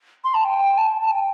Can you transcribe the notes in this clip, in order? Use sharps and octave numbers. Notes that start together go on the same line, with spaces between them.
C6
A5
G5
A5
A5
G5